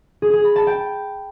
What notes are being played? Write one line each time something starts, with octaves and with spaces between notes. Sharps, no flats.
G#4
G#4
B5
A5
G5